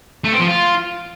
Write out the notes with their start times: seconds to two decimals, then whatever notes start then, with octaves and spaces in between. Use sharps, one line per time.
0.24 A3
0.32 C4
0.39 F3
0.47 F4